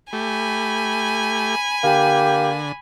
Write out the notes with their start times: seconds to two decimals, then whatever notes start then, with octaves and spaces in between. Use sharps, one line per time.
0.13 A3 G4 G#5 B5
1.84 D3 A#3 G4